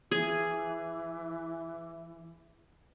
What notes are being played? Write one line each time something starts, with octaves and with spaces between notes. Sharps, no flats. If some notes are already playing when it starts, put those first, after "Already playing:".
E3 G#4